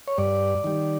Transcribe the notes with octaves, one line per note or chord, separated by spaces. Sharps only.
C#5
G2 D5
D#3 G3